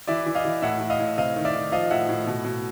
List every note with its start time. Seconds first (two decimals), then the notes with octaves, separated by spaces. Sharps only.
0.07 E3 D5 E5
0.26 E3
0.35 D#5 F5
0.45 E3
0.62 A2 E5 F#5
0.81 A2
0.90 D#5 F5
0.99 A2
1.18 C3 D#5 F5
1.36 D#3
1.45 D5 E5
1.55 D#3
1.72 F3 D#5 F5
1.91 A2 E5 F#5
2.09 A2
2.27 B2
2.45 B2